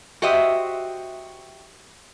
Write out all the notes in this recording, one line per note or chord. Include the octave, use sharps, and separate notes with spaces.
F#4 G4 C5 D#5 E5